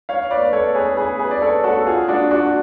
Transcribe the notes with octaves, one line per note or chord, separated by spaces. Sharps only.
C#5 F5
B4 D5
A4 C#5
G#4 B4
G#4 B4
G#4 B4
D5
A4 C#5
F#4 A4
F4 G#4
D4 F#4
D4 F#4